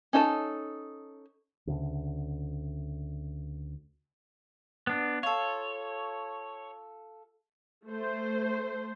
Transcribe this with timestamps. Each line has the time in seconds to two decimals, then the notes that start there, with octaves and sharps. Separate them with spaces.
0.13 C#4 D#4 A4 D5 A5
1.67 D2 C#3
4.87 B3 D4
5.23 F4 A4 C#5
7.87 A3 C5